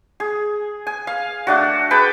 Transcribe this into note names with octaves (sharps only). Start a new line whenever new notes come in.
G#4
G#5
F5
A3 D4 F#4
G#4 B4 G5 A5